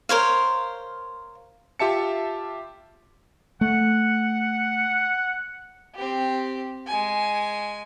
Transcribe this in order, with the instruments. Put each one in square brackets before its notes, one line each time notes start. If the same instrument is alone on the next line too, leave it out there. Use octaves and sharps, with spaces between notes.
[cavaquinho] A#4 C5 C#5 F5
[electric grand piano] F4 G4 E5 A5 C#7
[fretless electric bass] A3 [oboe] F#5
[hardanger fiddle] C4 G4
G#3 G#5